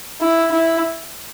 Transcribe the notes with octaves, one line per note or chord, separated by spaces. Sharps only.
E4
E4